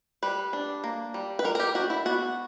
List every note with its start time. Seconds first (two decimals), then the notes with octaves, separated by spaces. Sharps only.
0.23 G3 B4
0.53 D4
0.84 A#3
1.14 G3
1.39 B4
1.44 G3 A#4
1.55 A#4
1.60 G4
1.75 D4 F#4
1.90 E4
2.05 B3 F#4